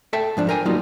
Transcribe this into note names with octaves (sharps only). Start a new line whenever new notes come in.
A4 E5 G5 A5
G#2 F3 D4
A#4 G5 G#5
F#3 G3 A#3 B3 D#4 F4